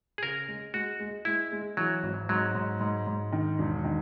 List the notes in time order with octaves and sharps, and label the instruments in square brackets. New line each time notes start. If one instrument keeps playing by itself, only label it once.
[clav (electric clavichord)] G#4
[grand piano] C#3 [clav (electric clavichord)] A#4
[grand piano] G#3
[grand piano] G#3 [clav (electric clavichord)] F#4
[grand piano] G#3
[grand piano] G#3 [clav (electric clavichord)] E4
[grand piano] G#3
[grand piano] E3 [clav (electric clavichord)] F#3
[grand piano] G#1
[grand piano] G#2 [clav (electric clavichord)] F#3
[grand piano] G#2
G#2
G#2
D#3
E1
D#3